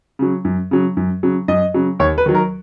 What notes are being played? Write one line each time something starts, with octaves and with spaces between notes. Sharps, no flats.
C#3 F#3
F#2
C#3 F#3
F#2
C#3 F#3
F#2 D#5
C#3 F#3
D#2 C#5
B4
D#3 F#3
A#4